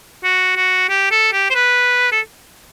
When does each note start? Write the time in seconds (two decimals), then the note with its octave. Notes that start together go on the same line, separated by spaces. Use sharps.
0.24 F#4
0.56 F#4
0.89 G4
1.11 A4
1.33 G4
1.50 C5
1.55 B4
2.12 A4